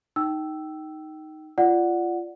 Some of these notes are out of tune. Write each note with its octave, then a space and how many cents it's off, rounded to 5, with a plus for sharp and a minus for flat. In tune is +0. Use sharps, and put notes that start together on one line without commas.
D#4 +5 G5 -20 E6 +5
F4 -20 D5 +0 F#5 -5